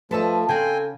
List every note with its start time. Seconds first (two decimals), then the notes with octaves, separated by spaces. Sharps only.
0.11 F3 A3 A4 B4 D#5 A5 E6
0.49 C#3 C4 A4 C5 G5 G#5